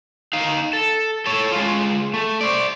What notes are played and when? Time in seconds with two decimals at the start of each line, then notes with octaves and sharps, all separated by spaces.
0.33 D#4 F5
0.73 A4
1.26 A4 C#5
1.52 G#3 F4
2.14 A3
2.41 C5 D5